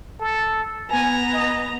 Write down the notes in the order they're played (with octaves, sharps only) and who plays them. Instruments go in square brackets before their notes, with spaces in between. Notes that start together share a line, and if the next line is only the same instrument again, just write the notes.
[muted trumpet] A4
[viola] B3 A#5 [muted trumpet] G#5
[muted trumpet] D#5